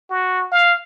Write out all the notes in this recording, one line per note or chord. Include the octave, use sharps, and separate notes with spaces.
F#4
F5